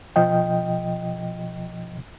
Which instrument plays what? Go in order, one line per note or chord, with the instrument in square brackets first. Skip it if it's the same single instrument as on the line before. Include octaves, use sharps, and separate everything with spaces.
[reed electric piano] B2 F3 D#5 G5